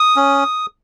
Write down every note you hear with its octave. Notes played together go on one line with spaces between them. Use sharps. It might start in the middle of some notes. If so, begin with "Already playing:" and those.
Already playing: D#6
C#4